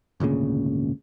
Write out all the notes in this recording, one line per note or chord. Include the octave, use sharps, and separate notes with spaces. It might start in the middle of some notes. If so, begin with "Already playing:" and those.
G#1 D2 A#2 C#3